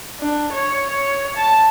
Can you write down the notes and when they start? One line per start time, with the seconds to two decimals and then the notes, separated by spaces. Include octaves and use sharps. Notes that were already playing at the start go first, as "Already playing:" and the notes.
0.20 D4
0.52 C#5
0.90 C#5
1.37 A5